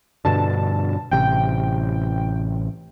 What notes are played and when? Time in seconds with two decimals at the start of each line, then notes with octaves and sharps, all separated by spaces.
0.25 G2 B2 D3 A5
1.11 A1 C3 G5